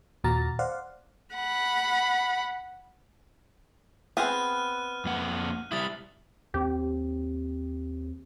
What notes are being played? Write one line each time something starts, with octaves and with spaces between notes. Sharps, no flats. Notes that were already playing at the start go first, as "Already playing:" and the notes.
D#2 A#2 F#4 A#5 A6
C5 D5 F5 F#5
F#5 B5
B3 C4 G#4 F6 F#6 D#7
F2 A#3 F#5
G3 E4 D#6 A6
D#2 C4 G4